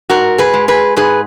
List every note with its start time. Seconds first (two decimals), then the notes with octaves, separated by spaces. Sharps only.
0.10 G#2 F#4 A#4
0.38 G#4 B4
0.54 G#3
0.68 G#4 B4
0.97 G#2 G#4 B4